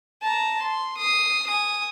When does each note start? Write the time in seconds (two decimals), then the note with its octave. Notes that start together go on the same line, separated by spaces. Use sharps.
0.23 A5 A#5
0.62 C6
0.98 D#6 C7
1.47 G#5 D#6